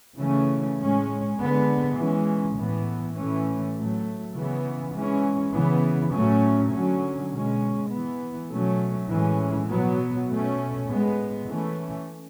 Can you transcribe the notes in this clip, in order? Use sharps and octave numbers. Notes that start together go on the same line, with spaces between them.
C#3 E3 A3 C#4
A2 G#3 C#4
D3 G#3 B3
E3 G#3 C#4
A2 E3 B3
A2 E3 A3 C#4
A2 F#3 A3
C#3 E3 B3
E3 G#3 C#4
C#3 E3 B3
A2 F#3 A3 C#4
D3 F#3 C#4
B2 G#3 C#4
E3 B3
B2 F#3 A3 C#4
A2 E3 G#3 C#4
B2 F#3 B3
B2 A3 C#4
A2 G#3 B3
E3 A3 C#4